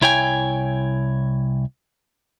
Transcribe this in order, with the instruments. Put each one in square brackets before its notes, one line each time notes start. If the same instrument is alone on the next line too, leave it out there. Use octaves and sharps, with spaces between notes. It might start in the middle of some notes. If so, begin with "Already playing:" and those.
[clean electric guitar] C2 E4 C#5 G5 G#5